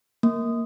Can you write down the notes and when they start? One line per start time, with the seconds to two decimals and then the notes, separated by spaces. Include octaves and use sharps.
0.23 A#3